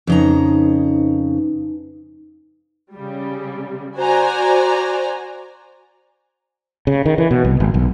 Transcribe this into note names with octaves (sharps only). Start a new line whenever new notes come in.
F2 C#3 D#4 B4 A#5
C#3 G3
F#4 C5 D5 G#5 A#5
C#3
D#3
E3
B2
C2
G#1
B1